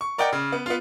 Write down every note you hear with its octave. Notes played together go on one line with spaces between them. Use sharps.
C#6
A#4 D5 D#5 F#5 G5
C#3
B3
B3 F4